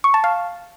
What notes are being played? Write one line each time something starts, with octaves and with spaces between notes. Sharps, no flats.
C#6
A5
F5